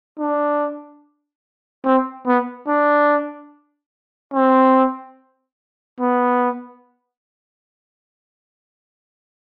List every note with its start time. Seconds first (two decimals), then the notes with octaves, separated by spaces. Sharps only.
0.19 D4
1.85 C4
2.26 B3
2.67 D4
4.34 C4
6.00 B3